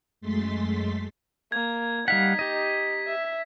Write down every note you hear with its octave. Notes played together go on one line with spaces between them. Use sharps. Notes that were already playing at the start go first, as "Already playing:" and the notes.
F#2 G#3 A3 C6 A6 B6
A#3 G#6
G3 D#4 F5 F#5 B6
G4 D#5
E5